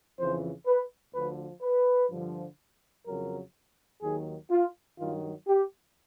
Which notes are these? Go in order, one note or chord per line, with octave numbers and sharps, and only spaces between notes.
F2 C#3 E3 C5
B4
D2 D3 F3 B4
B4
G2 D3 F3
F2 C#3 F#3 A#4
D#2 D#3 F#3 G#4
F4
G2 D#3 F#3 F4
G4